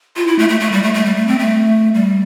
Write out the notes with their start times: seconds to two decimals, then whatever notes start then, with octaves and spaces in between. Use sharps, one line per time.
0.16 F4
0.27 E4
0.39 A3
0.49 A3
0.60 A3
0.72 G3
0.83 A3
0.94 A3
1.05 G3
1.16 A3
1.27 C4
1.39 A3
1.94 G3